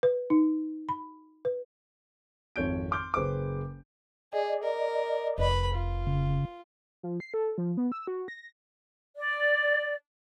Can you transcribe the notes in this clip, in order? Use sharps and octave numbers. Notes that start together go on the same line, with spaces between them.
B4
D#4
B5
B4
G#1 F2 C#5 G6 D7
C6 D6 F6 G6
F#1 B4 C5 D6
G#4 D5 D#5
A#4
F1 B4 B5
F4
C#3
F3
C7
A4
F3
B3
E6
F#4
A#6
D5